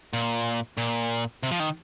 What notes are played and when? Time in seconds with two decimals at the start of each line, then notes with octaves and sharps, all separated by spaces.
0.13 A#2
0.77 A#2
1.43 C3
1.51 F3
1.60 D#3